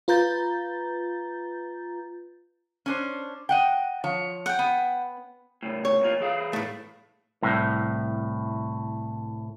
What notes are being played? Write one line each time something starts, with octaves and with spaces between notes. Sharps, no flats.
F4 B4 A#5 G6 A6
C#4 D4 C5
D#5 F#5 G5
F3 C#5
F#5 G5
B3
A2 C#3
C#5
A#2 E3 F4
E3 G#4 F5
A2 A3
C2 A2